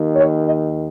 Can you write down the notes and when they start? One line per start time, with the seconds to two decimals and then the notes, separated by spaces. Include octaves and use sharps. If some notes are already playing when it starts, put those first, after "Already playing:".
Already playing: D#2 D#3
0.15 C#5
0.44 D#5